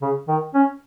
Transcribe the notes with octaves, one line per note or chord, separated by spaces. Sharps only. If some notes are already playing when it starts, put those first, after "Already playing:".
C#3
D#3
C#4